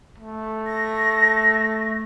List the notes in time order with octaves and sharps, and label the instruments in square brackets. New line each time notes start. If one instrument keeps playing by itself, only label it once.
[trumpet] A3
[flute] A#6